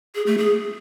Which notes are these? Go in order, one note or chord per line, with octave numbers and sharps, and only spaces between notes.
G#4
A3
G#4